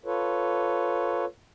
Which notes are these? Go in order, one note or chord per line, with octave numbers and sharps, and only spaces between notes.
F4 A4 B4 C#5